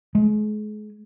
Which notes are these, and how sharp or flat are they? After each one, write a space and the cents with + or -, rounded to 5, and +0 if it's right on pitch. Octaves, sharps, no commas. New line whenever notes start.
G#3 +35